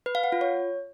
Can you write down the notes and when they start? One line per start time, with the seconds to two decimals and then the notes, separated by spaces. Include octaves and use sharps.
0.06 B4
0.15 F5
0.24 F#5
0.32 F4
0.41 C#5